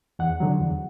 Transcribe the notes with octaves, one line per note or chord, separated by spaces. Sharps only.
E2 F#5
D3 F#3
E2